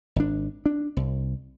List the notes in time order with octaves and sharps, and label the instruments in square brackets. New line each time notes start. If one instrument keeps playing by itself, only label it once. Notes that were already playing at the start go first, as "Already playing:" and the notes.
[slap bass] G#1 D4
D4
C2